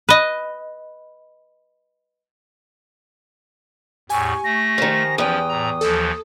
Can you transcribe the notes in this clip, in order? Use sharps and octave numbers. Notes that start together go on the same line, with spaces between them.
B4 D#5
E2 A2 G4 G#5 C#6
A3 A#6
D#3 F3
E2 F3 C#4 G5 D#6
A2 A#5
D#2 E3 F3 A4